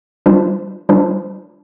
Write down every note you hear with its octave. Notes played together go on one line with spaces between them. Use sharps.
G3 D4 F4 C5
G3 D4 F4 C5